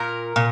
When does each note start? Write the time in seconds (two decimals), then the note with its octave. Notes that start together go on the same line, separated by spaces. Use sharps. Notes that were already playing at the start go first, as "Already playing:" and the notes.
Already playing: A#2 A#4
0.36 A#2